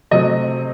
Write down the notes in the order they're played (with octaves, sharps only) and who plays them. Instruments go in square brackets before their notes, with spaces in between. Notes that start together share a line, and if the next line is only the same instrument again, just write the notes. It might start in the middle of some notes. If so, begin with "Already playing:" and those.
[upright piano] C3 F#3 A3 D#5